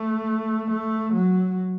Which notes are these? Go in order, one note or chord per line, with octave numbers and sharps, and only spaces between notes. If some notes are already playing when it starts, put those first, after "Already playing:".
Already playing: A3
A3
F#3